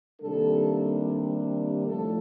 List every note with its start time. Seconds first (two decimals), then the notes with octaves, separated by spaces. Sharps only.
0.21 C3 D#3 G3 A#3 D4 A4
1.86 A2 F3 A3 A4